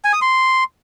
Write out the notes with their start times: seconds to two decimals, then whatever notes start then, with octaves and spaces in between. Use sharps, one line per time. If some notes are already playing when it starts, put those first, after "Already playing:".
0.05 G#5
0.13 D#6
0.22 C6